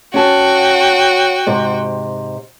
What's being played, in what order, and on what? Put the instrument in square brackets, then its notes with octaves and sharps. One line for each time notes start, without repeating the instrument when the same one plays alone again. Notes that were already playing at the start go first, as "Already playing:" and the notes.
[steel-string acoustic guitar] C#4 A5 [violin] F#4 G5
[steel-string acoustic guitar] G#2 C3